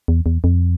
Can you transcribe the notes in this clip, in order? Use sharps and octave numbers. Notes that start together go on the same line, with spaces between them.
E2
E2
F2